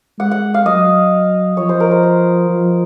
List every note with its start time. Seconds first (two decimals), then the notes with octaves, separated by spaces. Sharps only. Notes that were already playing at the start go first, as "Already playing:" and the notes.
0.19 G#3 F#5
0.31 F#5
0.54 F5
0.65 F#3 D#5
1.57 F3 C#5
1.69 C5
1.80 A#4
1.91 C5
2.03 C5
2.49 F3